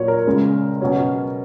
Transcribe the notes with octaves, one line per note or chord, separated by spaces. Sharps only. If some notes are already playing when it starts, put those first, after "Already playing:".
Already playing: A#2 F#3 A#3 F4 C#5
A#4
C#2 C#3 G#3
B2 F#3 C#4